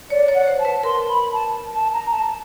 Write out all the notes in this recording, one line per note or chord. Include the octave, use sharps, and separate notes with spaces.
C#5 D5
C#5
F#5
C5
A5
B4
A#4 C6
B5
A5
A5
A#5
A5